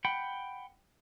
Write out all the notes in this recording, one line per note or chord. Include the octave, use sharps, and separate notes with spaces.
F#5 G5 B5